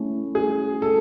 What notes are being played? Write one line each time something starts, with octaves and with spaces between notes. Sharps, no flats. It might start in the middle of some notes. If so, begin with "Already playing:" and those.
Already playing: A3 C#4 E4
G#4
A4